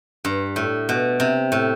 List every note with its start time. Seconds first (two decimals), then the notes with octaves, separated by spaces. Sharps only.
0.25 G2
0.56 A2
0.89 B2
1.20 C3
1.52 A2